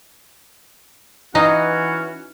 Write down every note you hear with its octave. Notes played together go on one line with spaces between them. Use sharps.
E3 C#4 D#4 F#4 D#5 F5